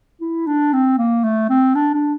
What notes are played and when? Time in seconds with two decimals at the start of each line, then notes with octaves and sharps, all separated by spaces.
0.21 E4
0.47 D4
0.73 C4
0.98 A#3
1.24 A3
1.49 C4
1.75 D4
1.94 D4